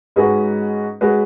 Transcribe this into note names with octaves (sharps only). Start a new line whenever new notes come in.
G#2 G#3 C#4 F#4 B4
G#3 C#4 F#4 B4